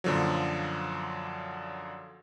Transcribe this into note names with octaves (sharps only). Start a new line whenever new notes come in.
F#2 A#2 D3 F3 F#3